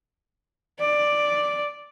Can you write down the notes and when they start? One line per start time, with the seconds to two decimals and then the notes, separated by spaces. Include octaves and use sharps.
0.80 D5